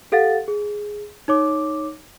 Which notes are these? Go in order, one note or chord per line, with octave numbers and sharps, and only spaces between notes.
G4 A4 F5 F#5 A6
G#4
D#4 C#5 D6